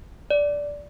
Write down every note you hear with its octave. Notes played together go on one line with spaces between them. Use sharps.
D5